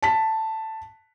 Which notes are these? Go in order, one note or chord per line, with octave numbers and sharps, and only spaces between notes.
A5 B6